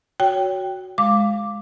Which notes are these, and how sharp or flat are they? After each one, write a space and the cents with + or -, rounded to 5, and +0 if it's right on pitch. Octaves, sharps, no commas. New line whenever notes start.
F#4 +0 C#5 +20 G5 +0
G#3 +0 F5 +0 D6 +0